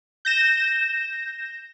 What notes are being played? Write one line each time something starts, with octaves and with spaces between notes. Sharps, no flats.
G6 A#6 E7